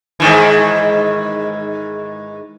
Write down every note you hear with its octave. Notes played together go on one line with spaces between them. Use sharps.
G#2 D#3 E3